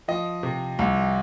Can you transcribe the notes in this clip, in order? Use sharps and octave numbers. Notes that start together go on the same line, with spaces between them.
F3 D#5
C3
C2